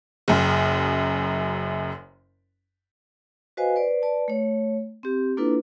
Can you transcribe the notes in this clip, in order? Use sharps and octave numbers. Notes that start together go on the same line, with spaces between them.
F#1 F#2
F#4 B4 C5 D#5 F5 G#5
B4 C5 D5
B4 D5 A5
A3 C#5
C4 G4
A#3 D4 E4 F4 A4 B4